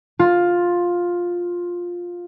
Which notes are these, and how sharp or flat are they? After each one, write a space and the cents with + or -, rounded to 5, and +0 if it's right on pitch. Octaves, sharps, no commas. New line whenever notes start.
F4 +10